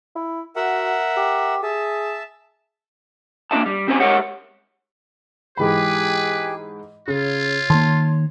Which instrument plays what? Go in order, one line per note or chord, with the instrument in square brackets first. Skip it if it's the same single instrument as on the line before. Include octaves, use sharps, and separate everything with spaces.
[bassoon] E4
[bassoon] F#4 [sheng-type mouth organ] A#4 E5 F#5
[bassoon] G4
[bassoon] G#4 [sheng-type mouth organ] E5 A5
[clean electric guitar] A#3 D4 D#4 E5 A5
G3
D2 C4 C#4 G4 C5 G#5
G#3 G4 A#4 C#5 E5 F#5
[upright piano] G#2 E3 B5 [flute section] G4 G#4 G5 [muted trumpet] B4
[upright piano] C#3 [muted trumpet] F4 [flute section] C#5
[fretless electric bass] D#3 A#3 [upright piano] A5 C6